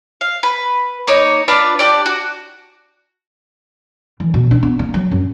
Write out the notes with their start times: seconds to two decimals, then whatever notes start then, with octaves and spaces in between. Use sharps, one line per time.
0.21 F5
0.43 B4
1.07 A#3 D#4 C#5 D#5
1.48 D4 F4 B4 D5
1.79 D4 G4 D5
2.06 F#4
4.20 E3
4.34 B2
4.51 D4
4.63 B3
4.79 A#3
4.94 F#3
5.11 F#2